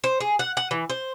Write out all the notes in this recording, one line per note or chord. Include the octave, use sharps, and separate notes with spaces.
C5
G#4
F#5
F#5
E3
C5